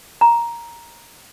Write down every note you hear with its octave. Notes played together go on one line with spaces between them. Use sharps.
A#5